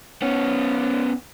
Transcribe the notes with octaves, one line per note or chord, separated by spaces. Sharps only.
B3 C#4